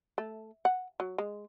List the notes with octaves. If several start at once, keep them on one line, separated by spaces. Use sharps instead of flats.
A3
F#5
F#3
G#3